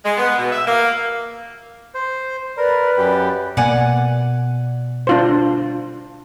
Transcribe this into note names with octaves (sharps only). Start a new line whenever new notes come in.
G#3
B3
B2
E5
A#3
C5
A#4 B4 D5 B5
F#2 G4
B2 A#3 D5 F#5 G#5
D4 F4 C5